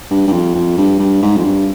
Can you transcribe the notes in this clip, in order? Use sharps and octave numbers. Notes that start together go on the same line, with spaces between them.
G2
G2
F2
F2
G2
G2
G#2
F2
G2